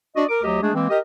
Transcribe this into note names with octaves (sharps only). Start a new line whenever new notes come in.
D4 F#4 D5 D#5
A#4 D6
D2 F#3 G4 D#5
G#3 A3 D4 G#4
E3 G#3 A#3 C4
G4 A#4 D#5